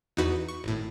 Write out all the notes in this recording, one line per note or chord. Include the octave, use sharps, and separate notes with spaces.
E2 D#4 F#4 B4
C#6
G#1 A2